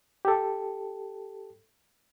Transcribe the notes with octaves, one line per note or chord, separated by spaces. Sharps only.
G4 A4